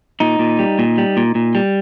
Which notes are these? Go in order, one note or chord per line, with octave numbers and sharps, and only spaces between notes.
A#2 D#4
A#2
G3
A#2
G3
A#2
A#2
G3